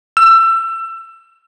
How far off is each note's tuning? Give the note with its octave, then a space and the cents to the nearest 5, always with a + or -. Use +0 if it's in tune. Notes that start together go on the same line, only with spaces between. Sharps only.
E6 +25